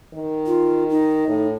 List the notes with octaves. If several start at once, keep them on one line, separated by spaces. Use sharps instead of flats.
D#3
F4
D#4
A2